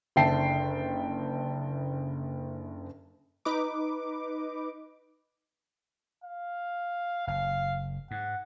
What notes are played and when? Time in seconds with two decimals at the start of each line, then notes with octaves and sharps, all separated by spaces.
0.16 F#1 D3 E5 G5 A5 C7
3.45 D#4 B4 D6
6.24 F5
7.27 F#1 F5
8.11 G#2 F#5